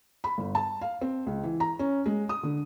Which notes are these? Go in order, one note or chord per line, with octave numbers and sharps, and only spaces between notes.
B5
G1
A5
F5
C4
C#2
E3
A#5
C#4
G#3
D#6
D3